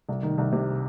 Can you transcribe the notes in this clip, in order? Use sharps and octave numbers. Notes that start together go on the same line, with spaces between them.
C2
D#3
C2
C3